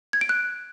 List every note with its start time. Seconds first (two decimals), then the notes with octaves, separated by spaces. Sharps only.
0.13 G#6
0.21 D7
0.29 F#6